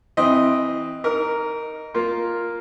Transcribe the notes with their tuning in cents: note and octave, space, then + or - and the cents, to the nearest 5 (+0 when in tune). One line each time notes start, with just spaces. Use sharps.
E3 -5 C4 +0 D#5 +0
D#4 +0 A#4 +0 D6 -45
A#3 +0 F4 +0